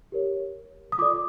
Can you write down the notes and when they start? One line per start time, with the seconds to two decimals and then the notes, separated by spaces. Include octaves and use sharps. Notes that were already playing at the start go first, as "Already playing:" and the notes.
0.12 G4 A#4 C#5
0.92 D#6
0.98 F4 A4 D5 D6